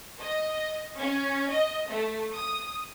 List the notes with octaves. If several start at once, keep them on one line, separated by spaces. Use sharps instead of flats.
D#5
C#4
D#5
A3
D#6